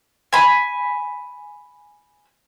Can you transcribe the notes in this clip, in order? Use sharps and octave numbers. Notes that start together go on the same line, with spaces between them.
G#5 B5